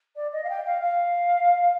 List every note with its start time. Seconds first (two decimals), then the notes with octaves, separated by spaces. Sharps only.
0.16 D5
0.32 D#5
0.43 F5
0.49 G5
0.66 F5
0.82 F5